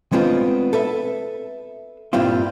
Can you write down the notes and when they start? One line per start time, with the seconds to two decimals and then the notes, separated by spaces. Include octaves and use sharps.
0.12 G#3 A3 B3 C4 D4 F4
0.73 A4 B4 E5
2.13 G2 A#2 G3 C4 E4 F4